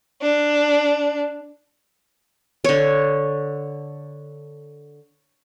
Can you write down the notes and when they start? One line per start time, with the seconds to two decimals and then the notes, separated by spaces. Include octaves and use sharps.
0.22 D4
2.64 D3 C#5